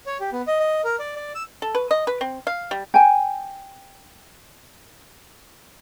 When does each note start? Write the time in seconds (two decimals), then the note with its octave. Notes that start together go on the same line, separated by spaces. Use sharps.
0.06 C#5
0.20 G4
0.32 B3
0.47 D#5
0.60 D#5
0.84 A#4
1.00 D5
1.16 D5
1.35 E6
1.62 A4
1.75 B4
1.91 D#5
2.07 B4
2.21 C4
2.47 F5
2.71 G3
2.94 G5 G#5